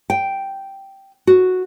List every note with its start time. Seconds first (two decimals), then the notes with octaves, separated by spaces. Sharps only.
0.10 G5
1.27 F#4